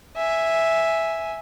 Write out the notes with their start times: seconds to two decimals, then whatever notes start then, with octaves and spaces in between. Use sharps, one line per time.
0.16 E5 G#5